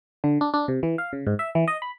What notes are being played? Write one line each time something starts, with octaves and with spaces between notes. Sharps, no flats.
D3
D4
D4
C3
E3
F5
C#3
G#2
E5
E3
D#5
B5